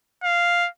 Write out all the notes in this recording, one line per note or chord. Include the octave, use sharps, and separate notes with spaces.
F5